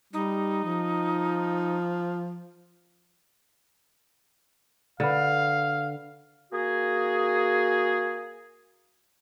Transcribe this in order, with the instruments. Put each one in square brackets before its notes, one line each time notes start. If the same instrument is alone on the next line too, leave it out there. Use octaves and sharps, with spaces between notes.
[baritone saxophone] G3 [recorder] D#4
[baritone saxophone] F3
[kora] D3 B4 [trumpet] F5
[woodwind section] A#3 F#4 G#4